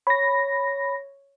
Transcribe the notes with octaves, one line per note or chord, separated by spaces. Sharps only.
C#5 B5 A#6